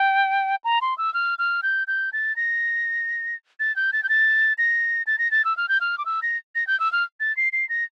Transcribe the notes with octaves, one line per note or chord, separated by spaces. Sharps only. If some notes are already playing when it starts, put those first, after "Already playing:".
Already playing: G5
A#5
C6
E6
F6
F6
G6
G6
A6
A#6
A6
G6
A6
G6
A6
A#6
A6
A#6
A6
E6
F6
G6
F6
D6
E6
A#6
A#6
G6
E6
F6
A6
C7
C7
A#6